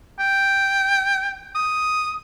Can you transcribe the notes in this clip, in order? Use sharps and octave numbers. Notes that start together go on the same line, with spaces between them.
G5
D#6